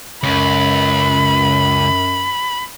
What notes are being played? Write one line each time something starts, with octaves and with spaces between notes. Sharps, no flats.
C#2 F#2 B5